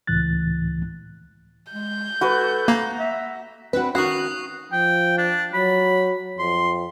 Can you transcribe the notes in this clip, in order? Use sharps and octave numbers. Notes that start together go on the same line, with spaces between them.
C#2 A2 E3 F#6 A6
G#3 G6
F#4 A4 B4
A#3 A#5
E5
C4 D4 F#4 B4
D#3 C#4 F#4 C#6 D#6 F#6 C7
F3 G5
D4
F#3 B5
F2 C6